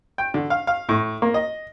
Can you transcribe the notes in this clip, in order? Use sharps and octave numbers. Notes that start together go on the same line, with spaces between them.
G5
D3
F5
F5
A2
A#3
D#5